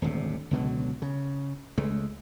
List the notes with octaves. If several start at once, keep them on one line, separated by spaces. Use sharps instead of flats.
D#1 G#1 D2 C3
C#2 B2 D3 F#3
C#3
C#2 G#3 A3